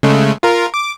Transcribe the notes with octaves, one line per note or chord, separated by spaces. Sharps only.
C#3 G#3 A3
F4 A#4
D6